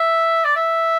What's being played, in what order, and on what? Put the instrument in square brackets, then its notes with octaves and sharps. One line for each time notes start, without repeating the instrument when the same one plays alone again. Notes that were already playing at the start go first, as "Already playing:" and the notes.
Already playing: [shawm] E5
D5
E5